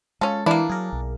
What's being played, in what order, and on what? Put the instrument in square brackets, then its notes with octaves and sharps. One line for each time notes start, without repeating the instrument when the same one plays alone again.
[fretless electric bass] G#3 [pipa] C#4 A4 [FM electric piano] F4
[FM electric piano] E3 [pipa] A#3 E4 [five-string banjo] D4
[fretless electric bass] F#3 [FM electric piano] G#4 A#4
[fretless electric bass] B1